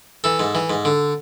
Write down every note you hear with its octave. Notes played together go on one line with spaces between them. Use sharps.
E3 A4
G#2
E3
G#2
D3